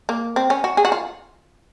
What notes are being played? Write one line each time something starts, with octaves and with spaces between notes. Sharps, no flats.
A#3
C4
C#4
F#4
G#4
F#4
F4